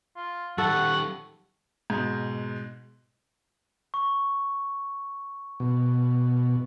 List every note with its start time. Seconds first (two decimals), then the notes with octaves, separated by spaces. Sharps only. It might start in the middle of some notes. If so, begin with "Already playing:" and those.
0.16 F4
0.58 D#3 G3 A4 F#5 C#6
1.90 G#2 B2
3.94 C#6
5.60 B2